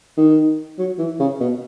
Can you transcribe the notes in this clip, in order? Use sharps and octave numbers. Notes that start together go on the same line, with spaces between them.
D#3
F#3
E3
C#3
B2